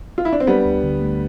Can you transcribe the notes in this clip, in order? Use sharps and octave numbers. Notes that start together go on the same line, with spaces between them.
F4
E4
D4
C4
G3 B3 D4
D2
D3
A3